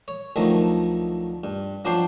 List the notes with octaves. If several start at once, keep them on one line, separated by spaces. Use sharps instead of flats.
C#5
D2 D#3 F3 F#3
G2
F3 F#3 D4 D5 G5 C6